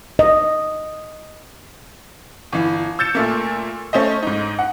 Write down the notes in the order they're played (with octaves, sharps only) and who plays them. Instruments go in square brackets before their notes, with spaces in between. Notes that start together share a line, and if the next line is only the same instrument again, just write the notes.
[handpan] D#5
[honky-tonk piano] G1 E3
E6 G6 A6 C#7 E7
A#2 A3 A#3
A3 C#4 C5 D#5
G#2 D#4
F#5